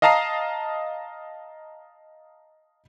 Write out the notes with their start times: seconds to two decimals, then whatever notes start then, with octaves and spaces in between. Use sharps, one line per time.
0.02 D#5 F5 A5 A#5 D#6 C7